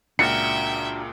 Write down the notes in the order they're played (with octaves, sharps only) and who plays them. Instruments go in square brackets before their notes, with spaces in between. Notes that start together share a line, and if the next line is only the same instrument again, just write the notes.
[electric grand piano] C#2 A#2 [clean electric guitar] D4 F#4 A#4 [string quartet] E5 G5 [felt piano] C#7